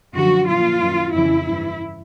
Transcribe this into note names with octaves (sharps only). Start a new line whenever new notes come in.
F#2 D3 F3 F#4
A#2 F3 F4
F#2 D#3
F2 C#3 E3 E4
G2 E3